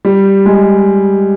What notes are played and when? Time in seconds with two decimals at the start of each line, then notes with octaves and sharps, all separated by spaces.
0.05 G3
0.46 G#3